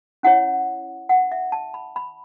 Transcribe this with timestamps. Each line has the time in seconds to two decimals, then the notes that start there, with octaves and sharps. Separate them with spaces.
0.23 C#4 E4 C#5 F#5
1.09 F#5
1.32 E5
1.52 A5
1.74 B5
1.96 B5